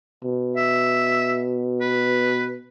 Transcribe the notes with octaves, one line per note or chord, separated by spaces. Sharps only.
B2
E5
B4